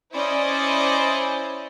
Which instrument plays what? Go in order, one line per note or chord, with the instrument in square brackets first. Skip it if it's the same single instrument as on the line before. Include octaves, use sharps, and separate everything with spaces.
[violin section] C#4 E4 C5 D5 D#5